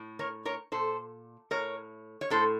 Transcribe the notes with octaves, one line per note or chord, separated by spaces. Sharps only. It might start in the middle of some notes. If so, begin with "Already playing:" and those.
Already playing: A2
A#4 C#5
A#4 C#5
A#2 A4 C5
A2 A#4 C#5
C#5
A2 A4 C5